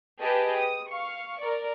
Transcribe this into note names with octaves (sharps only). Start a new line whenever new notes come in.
G4 G#4 B4 D#5 G5 A5
D#6
F5 C#6
A#4 D5